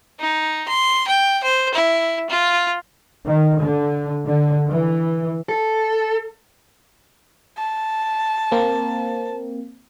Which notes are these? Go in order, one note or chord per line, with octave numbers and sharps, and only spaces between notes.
D#4
C6
G5
C5
E4
F4
D#3
D3
D3
E3
A4
A5
A#3 C4